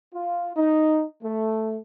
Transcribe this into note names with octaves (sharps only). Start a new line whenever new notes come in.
F4
D#4
A3